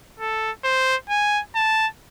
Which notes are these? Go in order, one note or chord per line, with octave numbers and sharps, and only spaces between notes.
A4
C5
G#5
A5